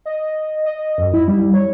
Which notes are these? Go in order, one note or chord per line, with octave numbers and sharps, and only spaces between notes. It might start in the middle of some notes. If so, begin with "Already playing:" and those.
D#5
D#5
F#2
E4
G3
C#5